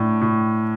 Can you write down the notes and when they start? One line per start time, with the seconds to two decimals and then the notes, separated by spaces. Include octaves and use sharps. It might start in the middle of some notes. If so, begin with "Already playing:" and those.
Already playing: A2 D4
0.21 A2